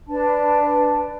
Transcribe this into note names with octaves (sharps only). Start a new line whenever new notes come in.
D4 B4 A5